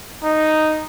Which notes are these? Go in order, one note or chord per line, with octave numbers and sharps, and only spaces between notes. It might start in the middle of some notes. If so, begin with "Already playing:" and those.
D#4